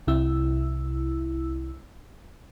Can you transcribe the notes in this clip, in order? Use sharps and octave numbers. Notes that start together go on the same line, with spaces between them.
C2 C3 E4 E6